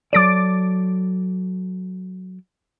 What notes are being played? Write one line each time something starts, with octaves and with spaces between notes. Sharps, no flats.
F#3 A4 D5 D6 A6 D7